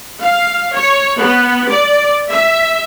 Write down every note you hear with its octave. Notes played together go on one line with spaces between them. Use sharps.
F5
C#5
B3
D5
E5